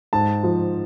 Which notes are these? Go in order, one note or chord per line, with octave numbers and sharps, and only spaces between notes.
G#2 A5
F3